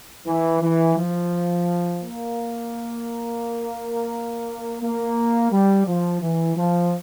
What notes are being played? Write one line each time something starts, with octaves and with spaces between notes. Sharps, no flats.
E3
E3
F3
A#3
A#3
G3
F3
E3
F3